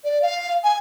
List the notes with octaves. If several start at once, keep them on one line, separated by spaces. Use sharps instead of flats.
D5
F5
G#5